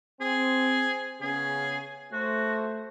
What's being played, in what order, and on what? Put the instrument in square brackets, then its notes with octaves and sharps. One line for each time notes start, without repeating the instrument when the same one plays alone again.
[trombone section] C4 [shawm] G#4
[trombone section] C#3 B3 C#4 [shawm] G#4
[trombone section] A3 C5 [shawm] F#4